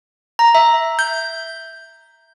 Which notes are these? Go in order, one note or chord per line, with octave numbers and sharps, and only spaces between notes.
A#5
E5
G6